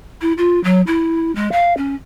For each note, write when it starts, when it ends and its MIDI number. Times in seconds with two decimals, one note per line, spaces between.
0.21 0.33 64
0.38 0.62 65
0.64 0.81 54
0.87 1.33 64
1.35 1.51 56
1.52 1.73 77
1.77 1.95 61